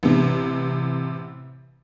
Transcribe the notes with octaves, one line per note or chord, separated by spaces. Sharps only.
A1 C3